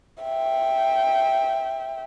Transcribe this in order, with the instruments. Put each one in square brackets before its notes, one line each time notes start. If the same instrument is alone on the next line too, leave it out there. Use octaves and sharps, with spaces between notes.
[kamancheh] E5 G5